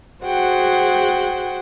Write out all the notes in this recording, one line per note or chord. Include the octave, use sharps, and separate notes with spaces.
F#4 G#4 C5 F#5 G5